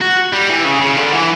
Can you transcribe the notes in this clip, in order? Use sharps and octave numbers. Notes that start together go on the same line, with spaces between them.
F#4
G3
E3
C#3
C#3
D3
E3